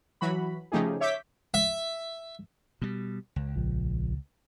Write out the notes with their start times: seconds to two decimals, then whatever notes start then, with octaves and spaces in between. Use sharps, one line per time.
0.21 E3 F#3 F#4 B5
0.72 C#3 F3 A3 D#4 G4 G#4
1.00 C#5 E5 D6 G6 B6
1.54 E5
2.82 B2 G3
3.36 C#2
3.56 A#1